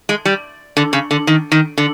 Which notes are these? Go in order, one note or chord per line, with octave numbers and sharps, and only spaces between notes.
G#3
G3
D3
C#3
D3
D#3
D#3
D3